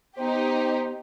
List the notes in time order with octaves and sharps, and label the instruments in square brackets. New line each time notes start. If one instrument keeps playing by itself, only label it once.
[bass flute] B3 [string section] D#4 G4 [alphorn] C5